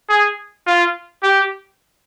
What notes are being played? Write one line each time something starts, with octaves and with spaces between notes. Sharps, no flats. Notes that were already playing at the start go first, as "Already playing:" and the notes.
G#4
F4
G4